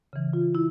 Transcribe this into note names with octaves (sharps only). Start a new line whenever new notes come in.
C#3 E3
F4
E4